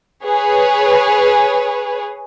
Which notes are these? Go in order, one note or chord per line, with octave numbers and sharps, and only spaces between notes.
G#4 B4 C#5